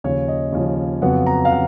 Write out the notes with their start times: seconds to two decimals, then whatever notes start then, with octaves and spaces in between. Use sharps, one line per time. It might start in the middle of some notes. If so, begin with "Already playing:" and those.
0.04 D#2 C#3 F3 C#5
0.28 D#5
0.52 D#2 C#3 F3
1.02 F2 C#3 F#3 B3 F#5
1.26 A#5
1.45 F5
1.51 C#3 F#5